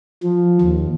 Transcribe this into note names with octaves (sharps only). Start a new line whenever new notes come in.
F3
D#2